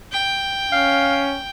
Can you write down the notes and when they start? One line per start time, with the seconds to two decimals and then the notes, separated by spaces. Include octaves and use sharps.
0.12 G5
0.72 C#4 F5